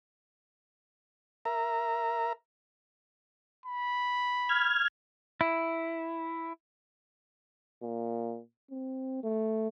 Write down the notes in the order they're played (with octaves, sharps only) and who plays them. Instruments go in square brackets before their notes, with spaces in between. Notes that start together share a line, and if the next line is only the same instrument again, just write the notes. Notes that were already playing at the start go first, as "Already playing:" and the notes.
[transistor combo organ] A#4 E5 A#5
[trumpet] B5
[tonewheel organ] F6 G#6
[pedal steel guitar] E4
[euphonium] A#2
C4
A3